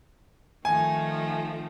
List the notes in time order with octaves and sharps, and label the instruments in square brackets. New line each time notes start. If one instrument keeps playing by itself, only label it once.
[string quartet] D#3 F3 A3 [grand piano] G#5